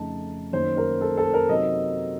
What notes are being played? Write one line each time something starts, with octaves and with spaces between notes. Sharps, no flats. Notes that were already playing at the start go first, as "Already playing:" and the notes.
Already playing: F2 C#3 A3 D#4 A5
F#2 D#3 A#3 D#4 C5
A#4
A4
A4
A#4
C3 F#3 C4 D#4 D#5